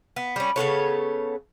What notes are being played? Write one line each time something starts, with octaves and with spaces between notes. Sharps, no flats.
B3
G3 C#4
C#3 B3 A4 C#5